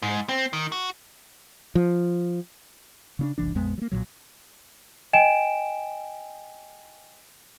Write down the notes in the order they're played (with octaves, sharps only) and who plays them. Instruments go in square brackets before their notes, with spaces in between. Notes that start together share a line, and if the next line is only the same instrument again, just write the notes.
[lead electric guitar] G#2
C4
D#3
F#4
[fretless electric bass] F3
C#3 C#4 D4
F#1 C2 E3 D4
A#1 F2 G#3 B3
F#3 A#3
B1 F2 A#2 F#3
[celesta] D#5 G5 G#5 D7 E7